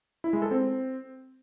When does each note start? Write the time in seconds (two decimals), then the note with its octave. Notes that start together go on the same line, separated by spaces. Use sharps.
0.24 E4
0.33 G#3
0.42 A4
0.51 C4